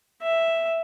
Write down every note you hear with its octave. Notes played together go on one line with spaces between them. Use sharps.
E5